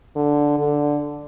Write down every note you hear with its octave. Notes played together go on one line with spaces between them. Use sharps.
D3
D3